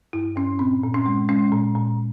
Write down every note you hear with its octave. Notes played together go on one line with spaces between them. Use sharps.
G2 E4
G2 C#4
A#2 C4
A#2
C#4
G#3
G#3 C#4
A#2
A#2